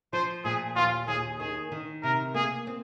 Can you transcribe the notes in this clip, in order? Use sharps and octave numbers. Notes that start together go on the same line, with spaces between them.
F3 C5
A#2 G#4
D#2 F4
D#2 G#4
D#3 G#4
D#3
C3 A#4
A#3 G#4
C4